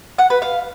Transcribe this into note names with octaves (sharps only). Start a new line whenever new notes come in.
F#5
B4
F5